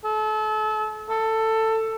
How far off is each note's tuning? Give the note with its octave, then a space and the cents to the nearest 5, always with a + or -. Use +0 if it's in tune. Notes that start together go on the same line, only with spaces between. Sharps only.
A4 -35
A4 +15